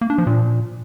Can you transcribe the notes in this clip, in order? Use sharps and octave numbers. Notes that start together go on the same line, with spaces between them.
A#3
D4
F3
A#2